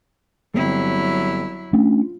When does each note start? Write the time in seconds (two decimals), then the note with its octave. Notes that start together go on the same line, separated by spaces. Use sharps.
0.54 G1 F#3 C4 E4
1.73 A3 C#4 D4 F4